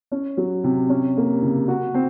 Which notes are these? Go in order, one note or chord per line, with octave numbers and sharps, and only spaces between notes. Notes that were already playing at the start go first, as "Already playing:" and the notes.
C#4
F#3
C3
C#4
A#3
C#3
F#4
C4